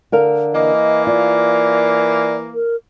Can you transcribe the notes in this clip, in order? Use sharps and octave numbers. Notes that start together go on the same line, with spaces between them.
D3 A#4 F5
E3 A#3 D#5
F4 D5
A#4